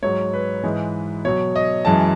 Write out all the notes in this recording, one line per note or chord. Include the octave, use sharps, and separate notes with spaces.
G#2 F#3 C#5
B4
G#2 E3 G#3
B2 F#3 C#5
D#5
F#2 E3 G#3 A5